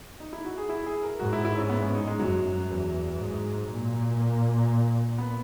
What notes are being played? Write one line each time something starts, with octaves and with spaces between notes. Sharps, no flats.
D#4
E4
F#4
G#4
E4
G#4
A#4
G#2 F#4
E4
E4
C#4
B3
C#4
D#4
G#3
F#2 F#3
E2
G#2
A#2
A#3
B3